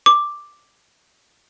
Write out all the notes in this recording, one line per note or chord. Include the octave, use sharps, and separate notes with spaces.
D6